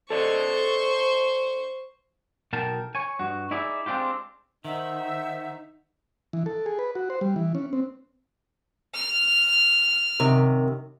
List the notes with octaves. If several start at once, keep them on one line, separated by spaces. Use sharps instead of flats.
A4 C5 D5 D#5 C#6
B1 B2 A#4 G5 A5
C#5 G#5
G2 F#4
D#4 E4 G#4 D5 E5
G#3 C4 D4 F4 G4
D#3 D#4 C5 D#5 E5 F#5
E3
A4
G#4
B4
F#4
C5
G3
E3
C#4
C4
F6
F#2 C3 D#3